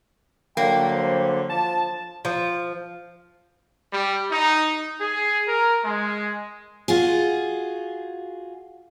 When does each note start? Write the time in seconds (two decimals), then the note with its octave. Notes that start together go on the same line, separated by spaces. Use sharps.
0.57 D3 F#3 G3 A#3 G5
0.93 C5
1.49 F3 A5
2.25 F3
3.92 G3
4.30 D#4
4.99 G#4
5.48 A#4
5.83 G#3
6.88 F4 F#4 G#4